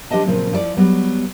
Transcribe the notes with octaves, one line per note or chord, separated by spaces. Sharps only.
F3 D4 G4 D#5 A5
A#2 C#3 F3 F#3 C4
F3 E4 C5 D5
F#3 G3 B3